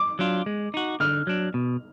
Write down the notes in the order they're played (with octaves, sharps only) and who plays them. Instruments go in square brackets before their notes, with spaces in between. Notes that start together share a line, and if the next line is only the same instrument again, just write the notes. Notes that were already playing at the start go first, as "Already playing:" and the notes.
Already playing: [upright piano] D6
[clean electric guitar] F#3 D4 F4
G#3
D#4 F#4
[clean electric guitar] D3 [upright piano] F6
[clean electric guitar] F#3 D4
B2